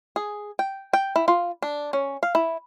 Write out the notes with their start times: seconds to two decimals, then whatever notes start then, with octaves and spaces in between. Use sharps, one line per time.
0.16 G#4
0.59 G5
0.93 G5
1.16 E4
1.28 F4
1.62 D4
1.93 C#4
2.23 F5
2.35 E4